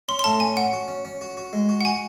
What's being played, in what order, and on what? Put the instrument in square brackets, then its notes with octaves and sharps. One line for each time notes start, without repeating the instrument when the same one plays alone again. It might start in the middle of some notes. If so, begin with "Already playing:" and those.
[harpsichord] C#4 [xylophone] C6
[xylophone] C6
[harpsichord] A2 [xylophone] A5
[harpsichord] C#4 [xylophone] G#5
[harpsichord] C#4 [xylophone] F#5
[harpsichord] F#4
C#4
C#4
F#4
F#4
G#3
F#4
[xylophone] F#5
[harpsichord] F#4 [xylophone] G#5